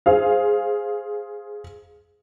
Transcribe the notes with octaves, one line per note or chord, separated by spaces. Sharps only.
G#4 C5 F5